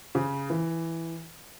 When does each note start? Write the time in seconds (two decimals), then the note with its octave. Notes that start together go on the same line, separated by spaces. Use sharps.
0.15 C#3
0.50 E3